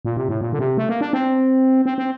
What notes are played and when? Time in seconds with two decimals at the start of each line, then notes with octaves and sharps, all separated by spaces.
0.05 A#2
0.17 C3
0.29 A2
0.41 A#2
0.53 D3
0.59 C3
0.78 A3
0.89 A#3
1.01 D4
1.13 C4
1.86 C4
1.98 C4